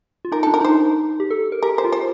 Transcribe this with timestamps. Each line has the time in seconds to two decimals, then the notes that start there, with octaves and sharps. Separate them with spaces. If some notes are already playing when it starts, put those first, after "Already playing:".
0.25 F4
0.32 D#4 A#4
0.43 A4
0.47 D4
0.54 A#4
0.61 D#4 C5
1.20 G4
1.31 A4
1.52 A#4
1.63 G4 A#4
1.78 C5
1.84 F4
1.92 C5